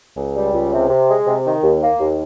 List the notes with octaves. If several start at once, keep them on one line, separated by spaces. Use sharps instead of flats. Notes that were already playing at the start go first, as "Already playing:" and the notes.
C#2
G3
C#2
C3
C3
G#3
C3
D#3
D#2
A#3
D#2